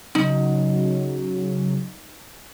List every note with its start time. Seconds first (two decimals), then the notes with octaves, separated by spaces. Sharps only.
0.15 C#3 F#3 D#4